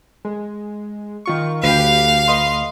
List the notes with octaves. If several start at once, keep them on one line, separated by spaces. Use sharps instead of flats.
G#3
D#3 F4 C#6
D2 G4 B4 F5
B4 D#5 C6